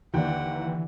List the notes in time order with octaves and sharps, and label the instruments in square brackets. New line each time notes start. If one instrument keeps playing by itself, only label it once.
[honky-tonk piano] D#2 A#3 G5 [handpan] D3 G4 D5 [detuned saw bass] E3 [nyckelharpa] F#5